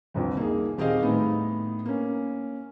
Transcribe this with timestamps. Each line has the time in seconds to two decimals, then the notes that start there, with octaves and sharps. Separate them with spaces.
0.14 G1 C2 F2
0.37 A#3 D#4 G#4
0.78 D#1 C4 G4 G#4 D#5 F5
1.03 A2 B3 D#4
1.86 A#3 C#4